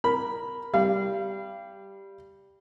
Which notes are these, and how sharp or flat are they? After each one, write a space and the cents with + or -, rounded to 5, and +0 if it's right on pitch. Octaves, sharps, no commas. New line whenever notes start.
A#4 +0 B5 +0
G3 +0 F5 -30